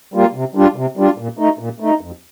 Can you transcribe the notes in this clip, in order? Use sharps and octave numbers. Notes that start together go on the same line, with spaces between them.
G3 A#3 F4
C3
G3 D4 F4
C3
G3 D4 F4
A#2
A3 D#4
A#2
A3 D#4
F2